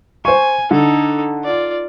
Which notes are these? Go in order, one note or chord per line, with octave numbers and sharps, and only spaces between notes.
C5 G#5 C#6
D3 D#4 A4
F4 D5